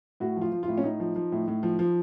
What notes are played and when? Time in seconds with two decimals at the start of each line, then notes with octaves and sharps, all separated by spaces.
0.20 A2 F#4
0.36 F3
0.42 F4
0.52 F3
0.63 F4
0.68 A2
0.78 C#4
0.83 A2 D#4
1.00 F3
1.16 F3
1.32 A2
1.48 A2
1.63 F3
1.79 F3